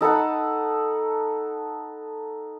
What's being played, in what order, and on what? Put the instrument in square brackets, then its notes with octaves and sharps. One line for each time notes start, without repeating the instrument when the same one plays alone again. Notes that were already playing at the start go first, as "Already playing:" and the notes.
[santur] D#4 A4 B4 F#5